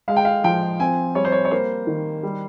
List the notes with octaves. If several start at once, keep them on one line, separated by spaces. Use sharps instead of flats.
G#3 F5
G5
F5
F3 G5
C4 G#5
G3 C#5
C5
C#5
C#5
A#3 C5
D#3
G3